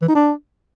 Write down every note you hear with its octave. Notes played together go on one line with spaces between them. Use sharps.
E3
D#4
D4